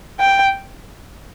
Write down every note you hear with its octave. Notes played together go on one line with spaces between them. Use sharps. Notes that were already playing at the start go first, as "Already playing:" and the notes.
G5